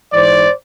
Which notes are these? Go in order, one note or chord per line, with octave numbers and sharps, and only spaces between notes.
G#2 E3 C5 D5